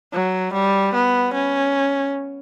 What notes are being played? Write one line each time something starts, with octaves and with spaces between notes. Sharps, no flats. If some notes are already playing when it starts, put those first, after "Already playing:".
F#3
G3
B3
C#4